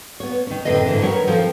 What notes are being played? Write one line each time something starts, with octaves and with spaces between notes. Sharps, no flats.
B3 C#5
D#3 C#4
F#2 A2 D3 C4 B4 D#5
G#2 D3 E3
D#3 F#3 A#4 B4 C#5
D#3 F3 C4 A4